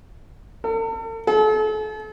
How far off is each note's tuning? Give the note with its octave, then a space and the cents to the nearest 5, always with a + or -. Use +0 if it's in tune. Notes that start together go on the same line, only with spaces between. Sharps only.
A4 +45
A4 -40